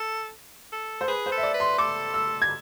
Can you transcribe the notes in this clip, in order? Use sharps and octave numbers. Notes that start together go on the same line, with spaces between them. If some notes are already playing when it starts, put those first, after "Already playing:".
Already playing: A4
A4
C5
G#4 B4
C5
A4
E5
D5
B4
C6
A4 D6
E6
G#6